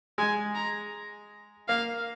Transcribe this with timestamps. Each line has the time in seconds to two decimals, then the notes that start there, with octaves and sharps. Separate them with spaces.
0.18 G#3 G#5
0.55 A#5
1.68 A#3 F5